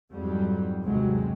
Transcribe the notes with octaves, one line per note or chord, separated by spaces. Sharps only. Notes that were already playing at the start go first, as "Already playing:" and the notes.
F2 G#2 F#3 G3
G1 D#2 C3 F#3 G#3 C4